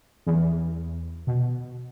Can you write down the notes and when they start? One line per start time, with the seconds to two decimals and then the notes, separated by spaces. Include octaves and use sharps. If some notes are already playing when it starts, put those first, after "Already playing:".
0.26 E2
1.27 B2